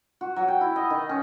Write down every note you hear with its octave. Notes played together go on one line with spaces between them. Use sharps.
F#4
F#3
G5
E4
D#5
D#3
C#4